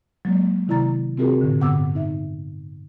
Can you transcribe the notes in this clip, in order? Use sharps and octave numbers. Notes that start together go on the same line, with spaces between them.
F#3 G#3 A#3
C3 D#3 E4 D5 A#5 A6
C3 C4 F4 F#4 G#4 A#4
A2 D3
G2 D3 B3 F#5 D6 E6
D#4 E5